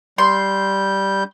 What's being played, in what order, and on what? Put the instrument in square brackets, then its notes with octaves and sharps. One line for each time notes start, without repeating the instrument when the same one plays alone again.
[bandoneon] G3 G6 [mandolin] C6